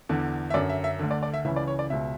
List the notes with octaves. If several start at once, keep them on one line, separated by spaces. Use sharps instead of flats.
E2 D3
E5
F#2 D3 D5
E5
E5
D2 D3
D5
D5
E5
C#2 C#3 E3 E5
D5
C#5
D5
C#2 B2 E5